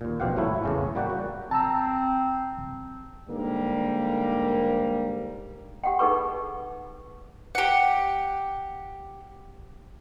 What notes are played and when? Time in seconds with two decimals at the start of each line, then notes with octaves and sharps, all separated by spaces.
0.01 D#2 A#2
0.20 A#1 B2 C4 G4 F5 F#5
0.36 G#1 A2 F#3 A3 E4
0.64 E2 A2 C#3 A3 C#4
0.95 G3 A#3 F#4 G4 D5 F#5
1.10 F#4
1.51 C4 A5 A#5 E6
3.28 G#2 D3 G3 A#3
5.84 G4 F#5 G5
5.99 D#4 G#4 A4 B4 C#6
7.55 G4 F#5